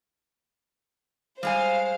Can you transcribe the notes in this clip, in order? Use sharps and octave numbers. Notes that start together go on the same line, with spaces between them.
G3 G#3 C5 F5 G#5